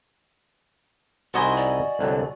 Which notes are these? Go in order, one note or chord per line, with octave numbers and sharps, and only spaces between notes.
C2 D#4 E4 F#4 D#5 G#5 C6
D5
C2 D3 F#3